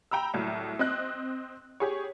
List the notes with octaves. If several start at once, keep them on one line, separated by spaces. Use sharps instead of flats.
G5 A#5 B5 E6
C2 A2 F#3
C4 D#5 F#6
G4 G#4 C#5